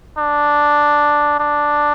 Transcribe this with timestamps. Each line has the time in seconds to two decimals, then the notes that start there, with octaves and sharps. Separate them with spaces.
0.18 D4
1.40 D4